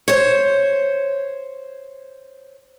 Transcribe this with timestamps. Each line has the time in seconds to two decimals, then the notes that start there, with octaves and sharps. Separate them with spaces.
0.08 C5 C#5